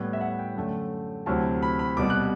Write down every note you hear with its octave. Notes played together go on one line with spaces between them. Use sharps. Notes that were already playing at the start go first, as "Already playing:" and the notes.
Already playing: A2 G3 B3 E4
E5
F#5
G5
F#2 D3 A3
D2 C3 F#3 C4 E4 A5
B5
B5
C2 B2 G3 D6
F#6